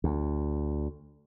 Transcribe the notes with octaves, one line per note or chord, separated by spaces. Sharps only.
D2